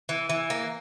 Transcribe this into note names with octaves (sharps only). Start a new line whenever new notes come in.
E3
E3
A#3